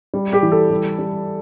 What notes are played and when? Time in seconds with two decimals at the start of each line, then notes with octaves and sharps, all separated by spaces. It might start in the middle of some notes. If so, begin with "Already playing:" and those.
0.14 G3
0.33 G4
0.42 E3
0.52 A4
0.70 G3
0.99 G3